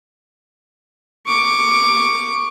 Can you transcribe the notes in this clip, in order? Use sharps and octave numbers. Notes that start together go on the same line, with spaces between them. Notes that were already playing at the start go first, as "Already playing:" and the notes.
C#6 D6